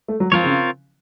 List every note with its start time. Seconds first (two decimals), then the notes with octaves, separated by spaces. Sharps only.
0.08 A3
0.20 F#3
0.32 F3 C4 F4 A#4 C#5
0.44 C#3